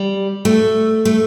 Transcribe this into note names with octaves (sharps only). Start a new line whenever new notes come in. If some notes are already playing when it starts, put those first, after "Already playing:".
Already playing: G3
A3
A3